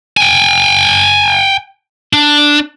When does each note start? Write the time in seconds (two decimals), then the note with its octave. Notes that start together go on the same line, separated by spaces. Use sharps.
0.17 G5 G#5
2.13 D4